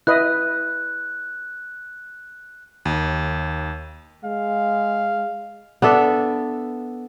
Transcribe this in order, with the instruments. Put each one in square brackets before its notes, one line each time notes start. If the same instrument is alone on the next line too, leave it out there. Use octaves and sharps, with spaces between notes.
[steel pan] E4 B4 D#5 [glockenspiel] F#6
[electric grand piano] D#2
[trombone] G#3 [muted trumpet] F5
[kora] B3 D4 A4 E5